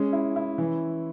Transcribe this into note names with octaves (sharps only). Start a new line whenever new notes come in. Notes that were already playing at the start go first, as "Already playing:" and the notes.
Already playing: G#3 C#4
E4
E4
E3